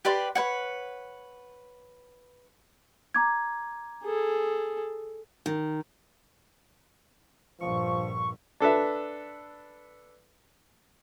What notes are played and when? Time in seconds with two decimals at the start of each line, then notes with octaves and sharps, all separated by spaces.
0.05 G4 B4 D5 C6
0.35 B4 C#5 F#5
3.15 A#5 D6 G#6
4.03 G#4 A4
5.46 D#3
7.61 A#1 G2 F3 C#6
8.60 D4 A4 B4 E5